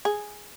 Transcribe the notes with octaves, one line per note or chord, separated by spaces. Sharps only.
G#4